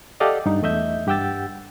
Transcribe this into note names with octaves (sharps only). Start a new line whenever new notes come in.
G4 A4 D5 D#5 F5 F#5
G2 D#4
E2 A3 D#5 E5 G6
G2 G4 F#5 G5 E6 A6